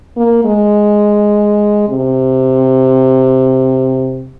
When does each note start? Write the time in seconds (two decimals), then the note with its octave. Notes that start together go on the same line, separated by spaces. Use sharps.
0.16 A#3
0.44 G#3
1.88 C3